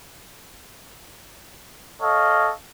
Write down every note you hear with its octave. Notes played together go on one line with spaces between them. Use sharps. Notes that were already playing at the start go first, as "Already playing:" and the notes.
A4 C#5 D#5 F5